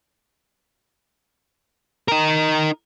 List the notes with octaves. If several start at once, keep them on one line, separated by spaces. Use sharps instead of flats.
D#4 A#4